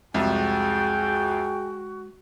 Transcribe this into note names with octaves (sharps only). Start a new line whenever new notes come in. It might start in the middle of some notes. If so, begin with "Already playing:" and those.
C2 F2 G#3 F#4 G#4 E5 G5